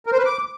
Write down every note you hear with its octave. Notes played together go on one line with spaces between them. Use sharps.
A#4
C5
B4
D6